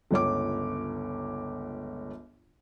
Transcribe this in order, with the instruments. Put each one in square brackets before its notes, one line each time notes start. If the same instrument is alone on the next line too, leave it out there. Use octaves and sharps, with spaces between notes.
[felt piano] G1 C#2 C#5 D6